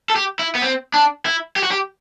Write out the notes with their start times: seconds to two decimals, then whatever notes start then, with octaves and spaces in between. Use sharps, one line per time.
0.10 A4
0.16 G4
0.39 E4
0.55 B3
0.62 C4
0.94 D4
1.26 E4
1.56 G4
1.63 F#4
1.71 G4